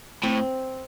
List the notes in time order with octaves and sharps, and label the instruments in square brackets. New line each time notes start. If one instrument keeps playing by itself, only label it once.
[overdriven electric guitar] A2 [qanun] C4